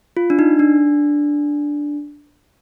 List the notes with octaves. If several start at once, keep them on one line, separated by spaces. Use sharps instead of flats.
F4
D4
D#4
D4